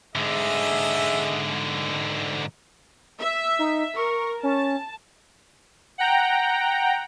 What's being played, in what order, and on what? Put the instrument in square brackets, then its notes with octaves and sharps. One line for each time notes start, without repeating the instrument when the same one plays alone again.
[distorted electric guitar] G#2 D3 [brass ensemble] G#4 D#5 E5
[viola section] E5
[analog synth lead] D#4
[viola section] A#4 [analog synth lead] C#6
[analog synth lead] C#4 [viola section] A5
[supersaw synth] F#5 G5 A#5